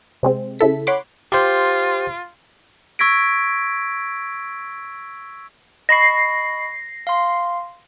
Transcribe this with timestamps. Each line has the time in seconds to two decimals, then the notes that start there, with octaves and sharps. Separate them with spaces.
0.23 C3 G#3 C4
0.59 C#3 E4 A4 B6
0.87 C#5 F#5 B5 C6 D6
1.32 F4 G4 C5
2.99 C#6 E6 G#6 A#6 B6 D7
5.89 D#5 B5 C#6 A#6 C7
7.07 F5 C6